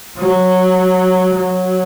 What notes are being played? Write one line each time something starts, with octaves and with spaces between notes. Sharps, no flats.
F#3
F#3